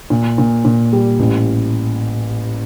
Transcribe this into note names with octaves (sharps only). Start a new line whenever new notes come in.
A#2
A#2
A#2
G3
A1